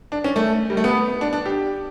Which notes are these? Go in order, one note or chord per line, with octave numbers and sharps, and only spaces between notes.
D4
C#4
A3
G3
A3
B3
D4
D4
G4